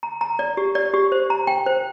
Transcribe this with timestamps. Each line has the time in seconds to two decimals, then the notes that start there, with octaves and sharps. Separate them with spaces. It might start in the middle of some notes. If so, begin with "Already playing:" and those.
0.03 A#5
0.21 A#5
0.39 D5
0.57 G4
0.75 D5
0.94 G4
1.12 C5
1.30 A#5
1.47 G5
1.66 C5